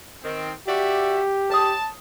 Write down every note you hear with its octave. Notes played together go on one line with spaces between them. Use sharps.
D#3 C4
F#4 G4 D5 E5
B4 C#5 A5 D#6